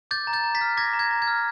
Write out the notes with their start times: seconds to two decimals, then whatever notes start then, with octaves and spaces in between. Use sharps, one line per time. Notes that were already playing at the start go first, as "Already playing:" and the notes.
0.11 D6 G6 A6
0.27 A#5
0.33 G6 A6
0.44 A#5
0.55 A6 B6
0.61 F6
0.77 D6 G#6 A#6
0.93 A#5
0.99 G#6
1.11 A#5
1.22 G#6
1.27 F6